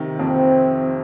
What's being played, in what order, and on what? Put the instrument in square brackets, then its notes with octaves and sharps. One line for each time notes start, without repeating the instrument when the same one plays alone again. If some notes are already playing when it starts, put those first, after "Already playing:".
Already playing: [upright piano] C3 D#3
[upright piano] F2 [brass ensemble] C4